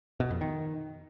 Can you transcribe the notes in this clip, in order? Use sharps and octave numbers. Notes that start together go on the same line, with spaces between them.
B2
F2
D#3